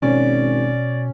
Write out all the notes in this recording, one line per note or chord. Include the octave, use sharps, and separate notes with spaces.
G#1 B2 C#4 D5